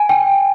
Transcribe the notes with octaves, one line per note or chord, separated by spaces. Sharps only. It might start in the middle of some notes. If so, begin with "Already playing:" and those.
Already playing: G#5
G5